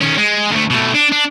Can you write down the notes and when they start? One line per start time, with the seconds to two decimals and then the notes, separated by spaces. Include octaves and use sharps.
0.01 D#3 C#4
0.18 G#3
0.51 D2 A3
0.70 B2 A3
0.94 D4
1.12 D4